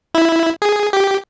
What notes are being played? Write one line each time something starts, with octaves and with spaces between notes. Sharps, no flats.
E4
G#4
G4